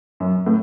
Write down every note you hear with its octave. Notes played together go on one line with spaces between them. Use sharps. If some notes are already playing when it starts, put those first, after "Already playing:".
F#2
A2